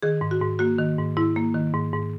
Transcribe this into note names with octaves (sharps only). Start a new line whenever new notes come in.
D#3 G#4
G#2
F#4
G#2
A#3 F#4
D#3
G#2
G#2 E4
A#3
D#3
G#2
G#2